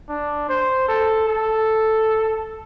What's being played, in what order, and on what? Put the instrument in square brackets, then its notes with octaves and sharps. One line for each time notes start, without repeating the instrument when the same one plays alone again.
[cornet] D4
C5
A4
A4